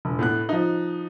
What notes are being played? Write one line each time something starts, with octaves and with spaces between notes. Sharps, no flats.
E1
A2 B3 F#6
F3 D#4